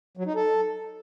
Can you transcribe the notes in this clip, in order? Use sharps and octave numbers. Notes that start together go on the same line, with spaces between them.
F#3
D#4
A4